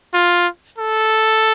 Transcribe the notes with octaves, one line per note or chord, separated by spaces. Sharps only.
F4
A4